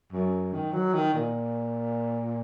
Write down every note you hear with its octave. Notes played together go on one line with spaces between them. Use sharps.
F#2
D#3
F#3
D#3
A#2